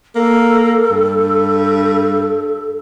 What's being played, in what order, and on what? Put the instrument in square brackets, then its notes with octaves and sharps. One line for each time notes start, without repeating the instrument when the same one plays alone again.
[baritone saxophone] A#3 [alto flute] A4
[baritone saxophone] G2